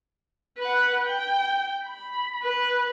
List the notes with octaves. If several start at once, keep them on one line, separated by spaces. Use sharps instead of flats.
B4 F#5
G5
B5
B4